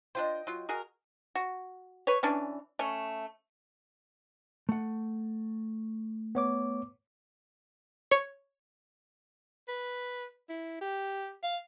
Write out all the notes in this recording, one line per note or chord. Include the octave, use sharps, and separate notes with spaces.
D4 F4 C5 D#5 G5
F#3 F4
F#4 G#4 A#4
F#4
B4 C#5
E3 C#4 D4
A3 C#4
A3 F#5
B3 C#5 D6
C#5
B4
E4
G4
F5